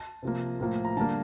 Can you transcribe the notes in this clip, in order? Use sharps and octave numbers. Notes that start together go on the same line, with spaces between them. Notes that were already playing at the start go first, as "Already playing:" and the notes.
Already playing: A5
C3 F3 A#3
A2 F3 A#3
A#5
D3 G3 A#3 A5